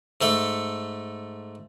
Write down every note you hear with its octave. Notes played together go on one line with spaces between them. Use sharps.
G#2 A3 A4